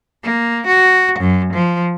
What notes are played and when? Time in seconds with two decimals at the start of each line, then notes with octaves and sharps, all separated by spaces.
0.24 A#3
0.67 F#4
1.19 F#2
1.53 F3